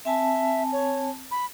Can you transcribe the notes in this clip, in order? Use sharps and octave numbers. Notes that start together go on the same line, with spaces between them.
C4 E5 G#5 A5
C#5
B5